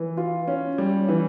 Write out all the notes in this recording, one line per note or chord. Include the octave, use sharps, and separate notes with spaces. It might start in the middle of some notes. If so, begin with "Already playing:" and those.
Already playing: E3
F4
C#4
G3
E3